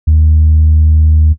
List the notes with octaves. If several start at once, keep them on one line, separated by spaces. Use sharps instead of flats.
D#2